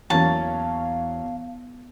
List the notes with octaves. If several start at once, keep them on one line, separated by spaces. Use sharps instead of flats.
E2 F#3 A#3 C#4 F5 A5